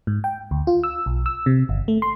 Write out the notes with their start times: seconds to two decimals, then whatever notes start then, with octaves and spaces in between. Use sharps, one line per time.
0.07 G#2
0.24 G5
0.51 D2
0.67 F4
0.84 E6
1.06 B1
1.26 E6
1.46 C3
1.69 G1
1.88 A3
2.02 C6